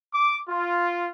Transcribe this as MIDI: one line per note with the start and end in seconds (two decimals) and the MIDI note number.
0.12 0.38 86
0.50 1.08 65